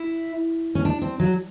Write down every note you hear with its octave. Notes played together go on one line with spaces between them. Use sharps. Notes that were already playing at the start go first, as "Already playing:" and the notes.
Already playing: E4
C#4
D4
C4
F#3